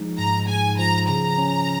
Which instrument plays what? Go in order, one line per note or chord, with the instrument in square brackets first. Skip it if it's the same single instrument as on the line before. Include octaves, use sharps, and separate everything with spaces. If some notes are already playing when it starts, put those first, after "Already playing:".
Already playing: [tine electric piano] F3 G#3 D#4
[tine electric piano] G#2 [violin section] A#5
[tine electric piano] G#2 [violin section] G#5
[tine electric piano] F3 [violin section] A#5
[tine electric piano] C#3 [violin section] A#5
[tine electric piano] C#4